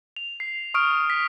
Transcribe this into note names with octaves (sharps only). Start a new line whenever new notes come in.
F7
C7
C#6 D#6 F6 D7
B6